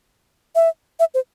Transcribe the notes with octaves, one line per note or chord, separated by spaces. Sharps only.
E5
E5
C5